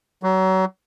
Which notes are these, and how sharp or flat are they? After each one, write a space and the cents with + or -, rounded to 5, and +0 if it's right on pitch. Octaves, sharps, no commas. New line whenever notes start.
F#3 +30